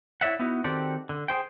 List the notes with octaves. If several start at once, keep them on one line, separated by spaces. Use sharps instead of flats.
E4 C#5 D5 E5 F#5
B3 D#4 E4 F#4
D#3 C4 F#4 G4 A4 D5
D3
G#4 C5 G5